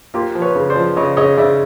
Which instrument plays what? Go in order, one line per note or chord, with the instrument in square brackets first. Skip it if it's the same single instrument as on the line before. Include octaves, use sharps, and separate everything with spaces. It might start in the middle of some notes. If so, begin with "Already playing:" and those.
[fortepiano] A#3 F4 G4
F3
B4 C#5
C#3
C5 D5
F3
C#3 C#5 D#5
C#3 C#5 D#5
C#3 D5 E5